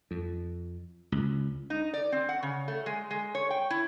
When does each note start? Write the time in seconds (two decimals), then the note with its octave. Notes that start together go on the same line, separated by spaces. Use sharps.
0.11 F2
1.12 C#2
1.70 D#4
1.94 D5
2.12 C4
2.29 F#5
2.43 C#3
2.68 A3
2.86 G#3
3.11 G#3
3.35 C#5
3.50 G5
3.70 E4